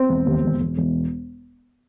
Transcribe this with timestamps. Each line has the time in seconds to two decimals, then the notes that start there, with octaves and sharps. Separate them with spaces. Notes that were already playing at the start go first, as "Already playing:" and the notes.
Already playing: C4
0.09 E1
0.26 D#2
0.44 E1
0.60 E1
0.77 E1